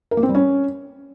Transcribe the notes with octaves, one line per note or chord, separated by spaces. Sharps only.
A#4
A#3
C4
G3
C#4